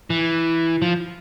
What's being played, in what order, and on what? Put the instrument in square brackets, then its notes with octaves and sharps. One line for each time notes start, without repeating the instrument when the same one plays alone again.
[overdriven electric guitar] E3
F3